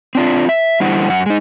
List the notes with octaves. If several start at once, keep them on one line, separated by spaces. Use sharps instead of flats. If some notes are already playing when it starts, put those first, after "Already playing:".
C4 D4 F4
E5
E2 D3 G3 E4 C5 F#5
F#2 F#5
G#3 D#4